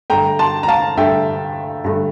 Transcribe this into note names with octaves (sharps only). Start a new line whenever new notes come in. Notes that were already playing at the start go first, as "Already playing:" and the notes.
G2 D3 A3 G5 A#5
A5 C6
A#5
F5 A5
G2 D3 A3 E5 G5
G2 D3 A3